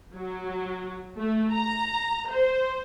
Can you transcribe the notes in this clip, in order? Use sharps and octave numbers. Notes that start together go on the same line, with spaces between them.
F#3
A3
A#5
C5